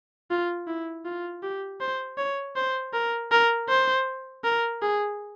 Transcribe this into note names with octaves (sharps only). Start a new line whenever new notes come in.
F4
E4
F4
G4
C5
C#5
C5
A#4
A#4
C5
A#4
G#4